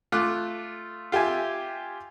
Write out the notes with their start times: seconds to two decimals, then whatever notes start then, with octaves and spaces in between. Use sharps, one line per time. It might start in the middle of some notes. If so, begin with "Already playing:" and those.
0.12 A3 F4 D6 F#6
1.12 F4 G4 E5 G#5